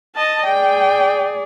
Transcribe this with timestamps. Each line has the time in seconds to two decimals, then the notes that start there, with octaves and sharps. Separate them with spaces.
0.15 D#5 A5
0.46 G#4 D5 G5